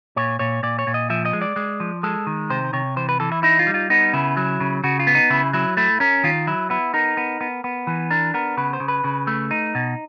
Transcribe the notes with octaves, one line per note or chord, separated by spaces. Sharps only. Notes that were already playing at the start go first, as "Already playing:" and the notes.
A#2 C#5
A#2 C#5
A#2 D5
C#5
A#2
D#5
F3 E5
D#5
G#3
D5
G#3
F3
G#3 A4
D#3
C3 C5
C3 C#5
E3 C5
B4
E3 A4
E4
D#4 E4
F4
G3
F4
B3 D#4
C#3 E4
F#3
C#3
C#3 F#4
F4
B3
D#4
C#3 E4
F#3 E4
A3 E4
C#4 A#4
D#3 F4
F#3 E4
B3 E4
D#4 A#4
B3
B3
B3
E3
D4 A#4
B3 A#4
C#3 B4
C5
C#3
B4
C#3
A3
D#4
B2